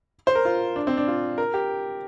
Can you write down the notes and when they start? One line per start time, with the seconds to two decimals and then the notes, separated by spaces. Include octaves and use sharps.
0.27 C5
0.35 A#4
0.45 F4
0.76 D4
0.87 C4
0.97 D4
1.08 F4
1.38 A#4
1.54 G4